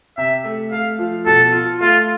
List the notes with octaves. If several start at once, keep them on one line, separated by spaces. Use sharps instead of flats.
C3 E5
A3
A3 F5
F3
B2 A4
F4
A3 F4